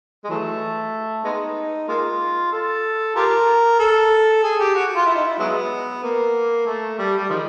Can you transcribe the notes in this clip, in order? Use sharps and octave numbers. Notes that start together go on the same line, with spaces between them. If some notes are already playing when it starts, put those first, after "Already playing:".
G#3
E3 F#3 A3
G#3 B3 D#4
G#3 A#3 F4
A4
F4 G4 A#4
A4
G#4
G4
F#4
F4
E4
D#4
E4
F#3 G#3 B3
A#3
A3
G3
G3
D#3 F3 G#3